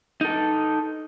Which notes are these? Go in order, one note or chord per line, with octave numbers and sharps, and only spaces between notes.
D#4 A4